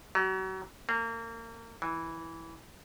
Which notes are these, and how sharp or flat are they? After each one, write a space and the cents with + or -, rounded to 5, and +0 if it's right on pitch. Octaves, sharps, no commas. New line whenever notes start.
F#3 +35
A#3 -30
E3 -5